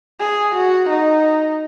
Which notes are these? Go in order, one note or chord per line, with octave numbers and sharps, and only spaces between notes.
G#4
F#4
D#4